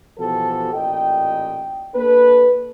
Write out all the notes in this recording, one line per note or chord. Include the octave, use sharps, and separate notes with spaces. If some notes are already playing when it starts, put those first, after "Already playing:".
B2 E3 F3 F#4 G4 A4
A1 A#2 D#5 G5
A#3 D4 A4 B4